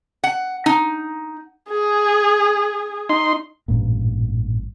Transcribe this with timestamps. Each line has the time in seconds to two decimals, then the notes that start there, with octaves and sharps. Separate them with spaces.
0.23 F#5
0.66 D#4
1.70 G#4
3.09 D#4 C6
3.68 A1 G2 A#2